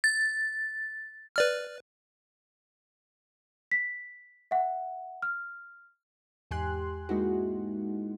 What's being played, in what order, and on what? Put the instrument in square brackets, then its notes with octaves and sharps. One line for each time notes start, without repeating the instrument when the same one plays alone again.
[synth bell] A6
[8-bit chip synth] B4 D5 F6
[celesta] B6
E5 F#5
F6
[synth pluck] E2 G#2 G4 G#5 C6 F#6
G#3 A#3 D#4 E4 F#4